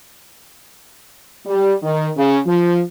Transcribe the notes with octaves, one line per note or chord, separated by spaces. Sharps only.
G3
D#3
C#3
F3